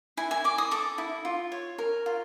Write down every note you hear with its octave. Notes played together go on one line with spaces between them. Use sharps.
E4 G#5
G#5
D5 D6
D#6
A4 D6
E4
F4
C#5
A#4
F4